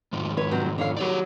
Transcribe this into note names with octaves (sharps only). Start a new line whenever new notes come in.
F2 G#2 D#3
B4 C#5
C3 F#3 C4
D3 C#5 F5
D#3 F#3 G4 C#5 D5